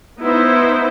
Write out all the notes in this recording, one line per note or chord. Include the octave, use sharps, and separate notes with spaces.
B3 D#4 E4 C5